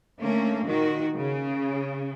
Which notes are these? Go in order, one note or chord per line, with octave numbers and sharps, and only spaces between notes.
D3 A3 A#3 C#4
A#2 D#3 F#4
C#3